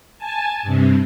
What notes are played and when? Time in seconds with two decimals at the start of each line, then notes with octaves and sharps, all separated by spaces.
0.18 G#5 A5
0.63 G2 C3